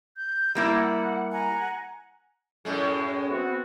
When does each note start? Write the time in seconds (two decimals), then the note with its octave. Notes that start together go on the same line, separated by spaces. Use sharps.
0.16 G6
0.55 G3 A#3 E4
0.75 F#5
1.31 F#5 G#5 A#5
2.65 F#2 A2 G#3
3.29 B3 C4 F#4